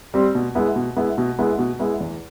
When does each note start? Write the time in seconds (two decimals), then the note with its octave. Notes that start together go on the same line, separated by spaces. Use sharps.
0.14 G3 C4
0.35 B2
0.55 G#3 B3 E4
0.76 B2
0.96 G#3 B3 E4
1.18 B2
1.39 G#3 B3 E4
1.59 B2
1.79 G#3 B3 E4
2.00 E2